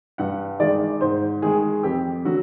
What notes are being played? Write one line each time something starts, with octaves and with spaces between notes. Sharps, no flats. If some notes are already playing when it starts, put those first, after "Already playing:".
G2 F#5
D#3 G#3 D5
G#2 C5
D#3 G#3 G#4
F2 G4
D3 F#3 F#4